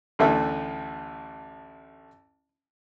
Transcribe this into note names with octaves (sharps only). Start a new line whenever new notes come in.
A1 D2 A2 A3 E5